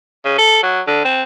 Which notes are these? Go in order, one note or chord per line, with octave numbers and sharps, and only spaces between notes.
C#3
A4
F#3
D3
C4